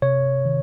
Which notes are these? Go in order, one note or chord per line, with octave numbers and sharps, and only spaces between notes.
C3 C#5
D#3